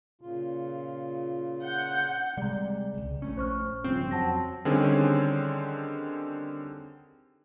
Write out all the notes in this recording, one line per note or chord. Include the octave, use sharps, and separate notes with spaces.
A#2 C#3 F4
F#5 G6
C3 G3 G#3 D5 A#5
D1 C#2
A#1 A3 C#4
C5 C#6 F6
G2 C#3 F3 C4
F2 F#3 F#5 A5 A#6
D3 D#3 G3 C4 C#4 G#4